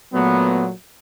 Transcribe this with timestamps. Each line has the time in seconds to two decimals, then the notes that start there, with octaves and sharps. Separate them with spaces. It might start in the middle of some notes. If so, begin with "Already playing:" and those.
0.12 A#2 F#3 A3 B3